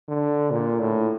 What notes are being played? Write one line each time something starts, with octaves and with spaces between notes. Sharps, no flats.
D3
A#2
A2